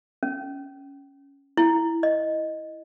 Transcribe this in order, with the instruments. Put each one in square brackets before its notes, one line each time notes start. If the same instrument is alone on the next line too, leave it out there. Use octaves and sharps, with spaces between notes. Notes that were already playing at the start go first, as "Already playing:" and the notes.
[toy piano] C#4
E4
D#5